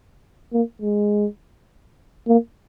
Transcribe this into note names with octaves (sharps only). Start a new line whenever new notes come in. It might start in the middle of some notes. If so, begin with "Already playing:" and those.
A#3
G#3
A#3